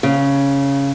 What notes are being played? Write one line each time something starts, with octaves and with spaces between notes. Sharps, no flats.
C#3